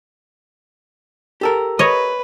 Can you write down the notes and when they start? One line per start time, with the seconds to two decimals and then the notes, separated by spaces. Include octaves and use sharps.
1.41 G4 A4 A#4
1.79 B4 C#5 D#5